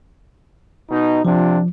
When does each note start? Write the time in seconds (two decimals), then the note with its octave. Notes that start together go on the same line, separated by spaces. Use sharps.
0.90 B2 D#4
1.25 C3 F3 D4 F4